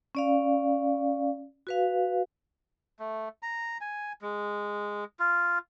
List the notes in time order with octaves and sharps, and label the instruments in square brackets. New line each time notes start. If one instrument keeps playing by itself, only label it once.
[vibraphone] C#4 D5 F5
F#4 B4 F5
[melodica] A3
A#5
G#5
G#3
F4